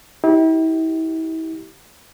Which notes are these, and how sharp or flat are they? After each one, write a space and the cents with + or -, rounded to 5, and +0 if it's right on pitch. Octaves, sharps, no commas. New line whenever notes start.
E4 -40 G4 -20